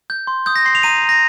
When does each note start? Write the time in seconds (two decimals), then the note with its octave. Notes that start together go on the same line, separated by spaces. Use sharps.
0.10 G6
0.27 C6
0.46 D#6 G6
0.56 A#6
0.65 C6 C7
0.75 F7
0.83 A#5 D#7
1.03 A#5
1.09 A#6